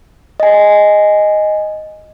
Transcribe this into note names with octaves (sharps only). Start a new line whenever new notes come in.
D#5 G#5